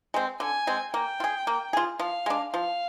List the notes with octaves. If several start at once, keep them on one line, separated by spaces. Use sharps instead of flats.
G#3 C4
D3 G#5
G#3 C4
A#3 G5
F4
G#4
A#3
F4 G#4
F3 F5
G#3 D4
F3 F5